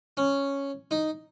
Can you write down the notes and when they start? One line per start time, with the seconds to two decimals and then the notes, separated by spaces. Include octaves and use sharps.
0.17 C#4
0.91 D#4